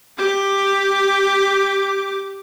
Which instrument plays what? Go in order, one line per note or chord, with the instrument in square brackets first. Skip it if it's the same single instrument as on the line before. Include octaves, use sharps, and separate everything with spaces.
[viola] G4 D6